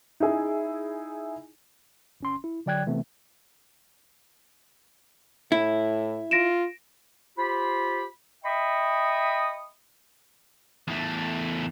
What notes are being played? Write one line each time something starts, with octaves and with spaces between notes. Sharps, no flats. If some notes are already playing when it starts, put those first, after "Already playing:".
D#4 E4 G#4
G1 C#4 C6
E4
D3 F#3 D5 G5 F#6 G#6
C3 E3 A3 B3 C4
A2 E4
F4 A#6 D7 E7
F4 G4 C5 B5
D#5 E5 G5 B5 C#6 D#6
E2 A3